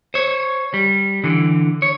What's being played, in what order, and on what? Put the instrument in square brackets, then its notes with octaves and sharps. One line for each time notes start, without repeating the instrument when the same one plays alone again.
[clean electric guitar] C5 C#5
G3
D3 E3
C#5